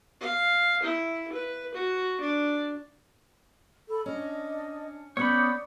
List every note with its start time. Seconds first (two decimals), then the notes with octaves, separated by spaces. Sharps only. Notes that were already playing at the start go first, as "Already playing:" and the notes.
0.20 F5
0.83 E4
1.33 B4
1.74 F#4
2.21 D4
3.88 A4 B5
4.06 C#4 D4 D#5
5.17 B3 C#4 C#5 D5 B5 D6 D#6 G6